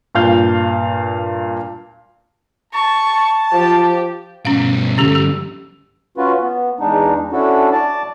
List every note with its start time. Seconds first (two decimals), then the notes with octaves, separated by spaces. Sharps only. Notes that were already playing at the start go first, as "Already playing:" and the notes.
0.15 G2 A#2 F5 G6
2.74 A5 C#6
3.53 F3 G4
4.45 G2 B2 C#4 F5
4.98 D2 G2 C#4 G4 A4
5.15 G4
6.18 C#4 F4 F#4 B4
6.41 B3
6.80 E2 G#3 D4 D#4
7.32 C#4 D4 E4 F#4 A4
7.72 D5 A5 D6